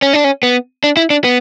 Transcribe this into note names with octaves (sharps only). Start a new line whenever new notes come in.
C#4
D4
C#4
B3
D4
E4
D4
B3